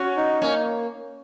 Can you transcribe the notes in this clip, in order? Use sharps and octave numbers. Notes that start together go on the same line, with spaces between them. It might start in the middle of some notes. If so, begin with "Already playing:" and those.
Already playing: C#4 F#4
D#4
A#3 C#4